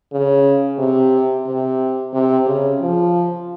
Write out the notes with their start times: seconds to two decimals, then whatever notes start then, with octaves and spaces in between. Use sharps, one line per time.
0.13 C#3
0.79 C3
1.47 C3
2.14 C3
2.47 C#3
2.81 F3